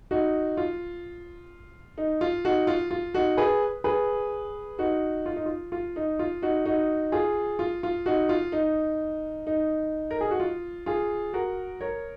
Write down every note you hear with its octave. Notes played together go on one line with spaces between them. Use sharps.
D#4 F#4
F4
D#4
F4
D#4 F#4
F4
F4
D#4 F#4
G#4 B4
G#4 B4
D#4 F#4
F4
D#4
F4
F4
D#4
F4
D#4 F#4
D#4 F#4
F4 G#4
F4
F4
D#4 F#4
F4
D#4
D#4
A#4
G#4
F#4
F4
F4 G#4
F#4 A#4
A#4 C#5